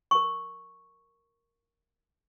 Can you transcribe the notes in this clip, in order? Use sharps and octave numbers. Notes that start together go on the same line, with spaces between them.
A#4 C#6